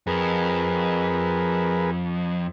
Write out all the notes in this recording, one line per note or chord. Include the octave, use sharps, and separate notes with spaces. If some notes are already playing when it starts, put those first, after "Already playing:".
F2 G#4 A#4 B4